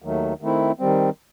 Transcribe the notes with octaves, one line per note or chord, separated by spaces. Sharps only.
D#2 D#3 F#3 A3
D#3 A3 C4 E4
D#3 G3 C4